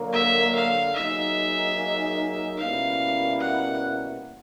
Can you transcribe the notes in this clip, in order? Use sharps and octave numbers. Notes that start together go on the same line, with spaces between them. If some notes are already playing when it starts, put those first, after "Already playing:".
Already playing: D3 F#3 A#3
E5
F5
F#3 A#3 D#4 G#4 E5
B2 G3 A#3 C#4 E4 F5
F#5